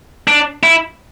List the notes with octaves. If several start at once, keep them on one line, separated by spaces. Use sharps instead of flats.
D4
E4